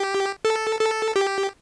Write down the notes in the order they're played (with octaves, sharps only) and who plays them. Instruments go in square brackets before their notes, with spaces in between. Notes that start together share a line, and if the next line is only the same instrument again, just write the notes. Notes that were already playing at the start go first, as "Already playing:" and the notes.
Already playing: [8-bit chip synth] G4
A4
A4
G4